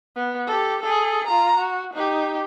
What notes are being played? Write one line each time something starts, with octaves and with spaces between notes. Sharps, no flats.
B3
G4 A4
G#4 A4
F4 A#5
F#4
D#4 G4